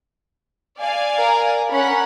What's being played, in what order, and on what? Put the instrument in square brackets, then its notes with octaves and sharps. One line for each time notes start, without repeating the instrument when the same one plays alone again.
[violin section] D5 F5 G#5
[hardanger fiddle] A#4
[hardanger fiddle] C#4 [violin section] A#4 F#5 B5